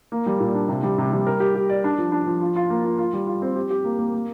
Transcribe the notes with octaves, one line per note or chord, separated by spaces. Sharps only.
A#3
G3
A#2
D4
C3
G3
C3
G3
A#4
G4
G4
D5
D4
F3
D4
F3
F4
F4
A#3
F4
F4
G3
F4
C4
G4
G4
A#3
A#3
A#3